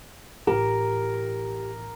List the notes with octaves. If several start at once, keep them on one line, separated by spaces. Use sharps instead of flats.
A1 E4 G4 A#4